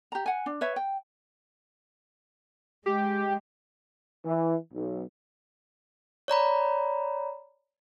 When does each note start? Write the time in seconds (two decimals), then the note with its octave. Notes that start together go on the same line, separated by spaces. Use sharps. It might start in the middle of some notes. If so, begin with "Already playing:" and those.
0.12 G4 A#5
0.26 F#5 G#5
0.46 D4
0.61 B4 C#5 E5
0.76 G5
2.86 G#3 G4
4.24 E3
4.73 B1
6.28 C#5 D5 A#5 B5